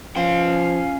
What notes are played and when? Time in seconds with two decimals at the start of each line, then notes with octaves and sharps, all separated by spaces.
0.16 F3 C#4 F5 C6